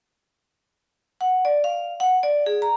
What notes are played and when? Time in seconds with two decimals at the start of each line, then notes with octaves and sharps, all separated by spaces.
1.21 F#5
1.45 D5
1.64 F5
2.00 F#5
2.23 D5
2.46 G#4
2.62 A#5